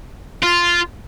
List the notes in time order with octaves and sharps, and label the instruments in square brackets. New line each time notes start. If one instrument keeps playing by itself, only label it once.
[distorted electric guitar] F4